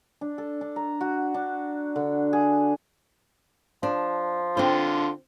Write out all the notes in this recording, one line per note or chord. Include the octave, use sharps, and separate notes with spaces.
D4
A4
D4
A#5
F#4
D4
D3
G#4
F3 D4
D3 C4 F4 C5